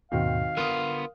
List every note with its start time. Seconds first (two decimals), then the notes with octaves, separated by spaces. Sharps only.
0.12 D#2 G#2 B2 D#3 C4 F#4 F5
0.57 D3 B3 F4 A#4 D#6 F6